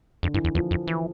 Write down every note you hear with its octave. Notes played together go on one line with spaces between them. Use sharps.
F2 D3
G2 E3
E2
E2 F3
F2
E3